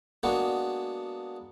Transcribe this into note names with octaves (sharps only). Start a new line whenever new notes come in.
G#3 A#3 B3 D4 F#4